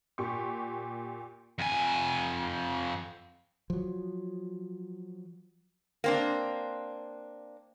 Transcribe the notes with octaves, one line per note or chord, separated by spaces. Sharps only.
A#2 G4 C6 C#6
F2 G#5
F3 F#3
A#3 C4 D4